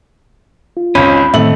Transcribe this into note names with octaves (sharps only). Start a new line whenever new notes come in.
F4
G#1 C#2 C#4 B5
A2 D#3 A3 C4 D#5 E5 F#7